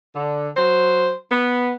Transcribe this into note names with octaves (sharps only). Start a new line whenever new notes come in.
D3
F#3 C5
B3